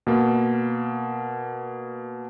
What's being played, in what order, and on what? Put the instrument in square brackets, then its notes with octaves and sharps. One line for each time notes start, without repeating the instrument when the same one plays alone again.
[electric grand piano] B2 A#3